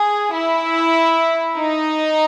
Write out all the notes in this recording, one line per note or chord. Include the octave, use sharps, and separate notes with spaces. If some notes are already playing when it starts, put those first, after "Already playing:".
Already playing: G#4
E4
D#4